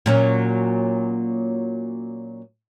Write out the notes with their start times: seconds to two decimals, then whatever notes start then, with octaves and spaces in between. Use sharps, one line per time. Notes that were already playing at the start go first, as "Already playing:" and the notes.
0.06 A#2 F#3 C#4